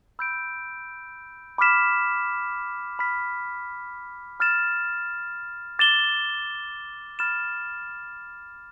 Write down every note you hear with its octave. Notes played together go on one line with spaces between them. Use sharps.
B5 E6 G6 D7
B5 D6 F6 B6 E7
B5 F6 B6
B5 F6 A6 E7
D6 A6 E7 G7
B5 F6 A6 E7